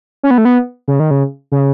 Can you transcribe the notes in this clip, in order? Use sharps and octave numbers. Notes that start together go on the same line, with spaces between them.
C#4
B3
A3
B3
C#3
D#3
C#3
C#3